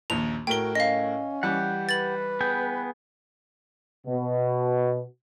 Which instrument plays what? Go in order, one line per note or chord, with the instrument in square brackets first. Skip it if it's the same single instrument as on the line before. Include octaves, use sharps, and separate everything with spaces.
[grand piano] A#1 D#2 [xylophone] F7
[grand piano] A2 A#4 G7 [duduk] F#4 [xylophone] G5
[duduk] C#4 [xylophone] D#5 F5
[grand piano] E3 G3 [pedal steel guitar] G4 F#5
[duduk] B4 [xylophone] A6 F#7
[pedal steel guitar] B3 G#4 G5
[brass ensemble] B2